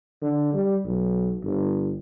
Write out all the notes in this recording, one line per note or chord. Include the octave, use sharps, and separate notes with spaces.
D3
G3
B1
G1